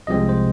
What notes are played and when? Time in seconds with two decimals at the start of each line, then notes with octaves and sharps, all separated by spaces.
0.07 C2 C3 F3 G#3 C4 D#5
0.29 C5